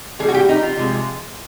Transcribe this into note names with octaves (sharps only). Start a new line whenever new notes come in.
A2 E3 G3 G#4
F#4
G4
D#4
F4
C3 F3 G#3